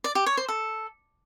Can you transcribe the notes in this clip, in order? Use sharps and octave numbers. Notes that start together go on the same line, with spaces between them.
D5
G4
C#5
C5
A4